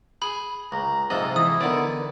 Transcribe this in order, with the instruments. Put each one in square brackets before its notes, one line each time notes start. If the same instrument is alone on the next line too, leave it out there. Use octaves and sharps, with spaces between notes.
[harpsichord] G#4 [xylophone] B5
[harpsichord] C#2 [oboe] A#5
[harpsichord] G#2 C3 F3 [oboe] A4 [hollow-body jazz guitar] D#5
[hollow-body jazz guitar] E3 [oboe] E4 [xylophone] D#6
[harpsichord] D3 D#3 [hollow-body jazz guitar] B3 D5